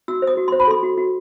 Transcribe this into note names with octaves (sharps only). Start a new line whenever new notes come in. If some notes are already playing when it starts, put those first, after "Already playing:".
F#4 E6
C5
D#6
F#4
C5 C6
B5
A4 C6
F#4
F#4